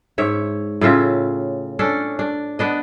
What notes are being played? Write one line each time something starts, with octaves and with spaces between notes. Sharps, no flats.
G#2 C#5 E5
A2 C#3 F4 E5
C#4 D4 A4
D4
B3 D4 D#5